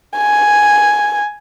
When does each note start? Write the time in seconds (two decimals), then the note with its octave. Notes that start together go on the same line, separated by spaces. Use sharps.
0.18 G#5